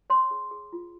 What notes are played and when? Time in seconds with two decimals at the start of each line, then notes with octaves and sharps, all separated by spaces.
0.10 C#5 C6
0.31 G#4
0.51 G#4
0.73 F4